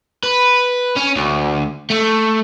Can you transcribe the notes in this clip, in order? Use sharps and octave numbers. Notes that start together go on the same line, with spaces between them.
B4
C#4
D2
A3